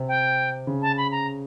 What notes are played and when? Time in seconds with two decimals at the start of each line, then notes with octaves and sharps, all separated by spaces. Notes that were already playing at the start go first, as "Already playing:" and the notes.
Already playing: C3
0.08 G5
0.67 C#3
0.82 A5
0.97 B5
1.12 A#5